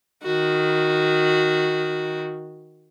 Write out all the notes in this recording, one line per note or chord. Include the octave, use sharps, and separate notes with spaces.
D#3 F#4